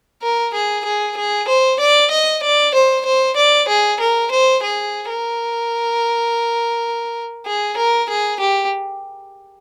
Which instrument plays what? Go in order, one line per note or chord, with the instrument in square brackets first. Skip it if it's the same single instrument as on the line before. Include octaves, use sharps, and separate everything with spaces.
[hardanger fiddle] A#4
G#4
G#4
G#4
C5
D5
D#5
D5
C5
C5
D5
G#4
A#4
C5
G#4
A#4
G#4
A#4
G#4
G4